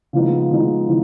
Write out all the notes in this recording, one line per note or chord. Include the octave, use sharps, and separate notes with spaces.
C#3 F3 G#3 B3 D#4
C#3 F3 G#3 B3 D#4
C#3 F3